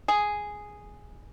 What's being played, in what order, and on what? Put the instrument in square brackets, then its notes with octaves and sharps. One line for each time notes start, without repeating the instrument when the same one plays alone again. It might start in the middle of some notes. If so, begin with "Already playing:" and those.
[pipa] G#4